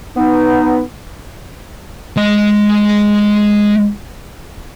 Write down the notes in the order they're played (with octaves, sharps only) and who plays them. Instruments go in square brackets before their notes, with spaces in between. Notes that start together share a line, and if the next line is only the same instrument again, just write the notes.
[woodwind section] B3 D#4
[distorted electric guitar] G#3 D#5